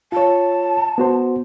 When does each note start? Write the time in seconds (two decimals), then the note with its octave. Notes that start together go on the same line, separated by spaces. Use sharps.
0.12 F4 C#5 A5
0.98 B3 F#4 C5